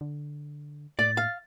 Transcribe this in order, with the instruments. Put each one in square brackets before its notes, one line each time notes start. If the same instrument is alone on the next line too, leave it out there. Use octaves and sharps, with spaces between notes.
[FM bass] D3
[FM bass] A2 [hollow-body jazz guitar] D5 [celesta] A6
[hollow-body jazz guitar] F5